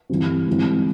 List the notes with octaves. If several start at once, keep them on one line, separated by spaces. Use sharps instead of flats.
G2 E3 G3 C4
G#2 E3 G3 C4